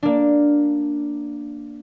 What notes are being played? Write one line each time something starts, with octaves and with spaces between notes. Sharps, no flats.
A#3 D4